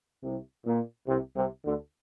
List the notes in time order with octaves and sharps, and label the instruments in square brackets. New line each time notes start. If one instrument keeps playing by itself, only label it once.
[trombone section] C2 C3
A#2
C2 C3
C2 C3
D2 D3